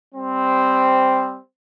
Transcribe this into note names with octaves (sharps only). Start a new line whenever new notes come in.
G3 C4